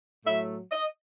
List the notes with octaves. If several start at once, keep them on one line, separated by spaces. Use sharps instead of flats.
A2 F#3 A3 E5
D#5